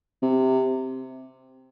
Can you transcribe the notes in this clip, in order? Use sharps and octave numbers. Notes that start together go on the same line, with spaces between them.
C3